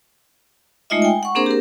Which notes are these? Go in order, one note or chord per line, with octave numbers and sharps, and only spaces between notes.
G#3 A3 D#4 F4 D#5 E5
G5 G#5
F#5 C#6
A#3 C4 D4 G#4 A#4 C5
G4 A#4